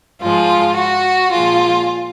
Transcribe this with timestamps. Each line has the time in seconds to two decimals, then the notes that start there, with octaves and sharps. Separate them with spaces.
0.21 G#2 F3 G#3 F4
0.76 F#4
1.32 A#2 F3 G#3 F4